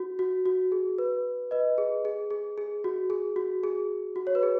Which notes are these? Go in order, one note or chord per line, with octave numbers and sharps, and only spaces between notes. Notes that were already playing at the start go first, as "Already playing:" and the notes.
Already playing: F#4
F#4
F#4
G#4
B4
B4 D#5
G#4
G#4
G#4
G#4
F#4
G#4
F#4
G#4
F#4
C#5
B4
G#4